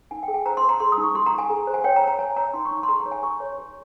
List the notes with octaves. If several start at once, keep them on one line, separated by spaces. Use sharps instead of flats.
D#4 G#5
G5
G#4
G#5
C5 A#5
C6
C5
A#5
G#4 C6
D#6
D#4
C#6
G4 C6
A#5
G4
G#5
G#4
C5
G#5
C#5 G5
A#5
C#5
A#5
C#5 G#5
C#5 A#5
D#4 C6
C#6
D#4
C#6
C6
G#4 A#5
A#5
C#5
G#5
G4 C#6
C#5
G4